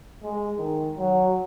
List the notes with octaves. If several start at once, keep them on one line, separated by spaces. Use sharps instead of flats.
G#3
D#3
F#3